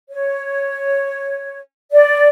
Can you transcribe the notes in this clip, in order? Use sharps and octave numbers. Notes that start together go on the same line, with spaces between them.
C#5
D5